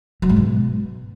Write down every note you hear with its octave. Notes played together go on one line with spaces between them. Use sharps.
F#3
G#2
B2